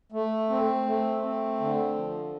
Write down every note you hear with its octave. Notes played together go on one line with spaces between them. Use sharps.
A3
C4
A3
C4
D3
F3